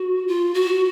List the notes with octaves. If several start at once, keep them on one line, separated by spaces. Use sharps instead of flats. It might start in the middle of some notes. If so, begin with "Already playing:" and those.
Already playing: F#4
F4
F#4